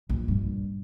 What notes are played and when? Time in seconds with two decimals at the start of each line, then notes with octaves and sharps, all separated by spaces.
0.10 A#1 E3
0.28 G2 A#2